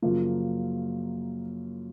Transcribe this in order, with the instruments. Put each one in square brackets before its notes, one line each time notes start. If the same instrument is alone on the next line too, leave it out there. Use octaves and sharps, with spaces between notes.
[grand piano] F#2 C#3 F3 A#3 F4